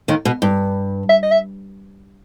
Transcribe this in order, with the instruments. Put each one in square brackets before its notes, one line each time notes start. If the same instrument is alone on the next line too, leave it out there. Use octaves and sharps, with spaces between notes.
[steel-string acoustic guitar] D#2 D#3
B2
G2
[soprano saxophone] E5
D#5
E5